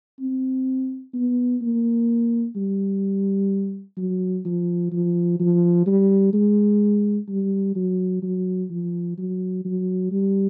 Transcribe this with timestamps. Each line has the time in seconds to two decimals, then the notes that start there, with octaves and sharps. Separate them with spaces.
0.20 C4
1.14 B3
1.62 A#3
2.56 G3
3.97 F#3
4.45 F3
4.92 F3
5.40 F3
5.86 G3
6.33 G#3
7.29 G3
7.76 F#3
8.23 F#3
8.71 F3
9.18 F#3
9.65 F#3
10.12 G3